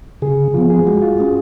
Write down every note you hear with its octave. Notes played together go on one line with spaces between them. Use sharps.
C#3 G#4
F3 B3 F4
G#4
G#3 F#4
F4
C#4 G#4